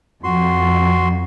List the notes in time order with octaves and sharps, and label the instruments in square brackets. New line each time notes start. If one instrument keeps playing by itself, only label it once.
[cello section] F2 [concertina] F#4 C6